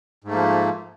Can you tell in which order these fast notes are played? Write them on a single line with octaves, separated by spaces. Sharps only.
G#2 A3 A#3 F3